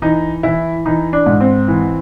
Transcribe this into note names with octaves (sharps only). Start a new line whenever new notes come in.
E3 D#4
E3 E4
E3 D#4
D4
G#2
C4
E3